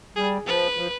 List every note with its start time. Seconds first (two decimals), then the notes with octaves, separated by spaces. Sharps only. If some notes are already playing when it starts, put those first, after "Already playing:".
0.16 G3 G#4
0.46 F3 B4
0.77 F3